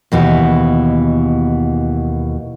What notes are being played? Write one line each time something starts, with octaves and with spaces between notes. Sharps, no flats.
D#2 B2 E3